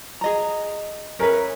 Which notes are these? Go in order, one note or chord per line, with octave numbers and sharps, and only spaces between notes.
G#4 D#5 A#5
C#4 G#4 A#4 B4 E5